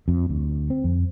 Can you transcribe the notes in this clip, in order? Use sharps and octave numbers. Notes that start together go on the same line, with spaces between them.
F2
D2
C4
F2